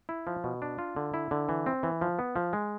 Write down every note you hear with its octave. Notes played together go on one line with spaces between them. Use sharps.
E4
F3
B2
D4
F4
D3
E4
D3
E3
C4
E3
F3
B3
F3
G#3